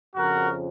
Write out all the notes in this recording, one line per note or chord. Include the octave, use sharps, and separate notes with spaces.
F2 C#3 F3 F#4 A#4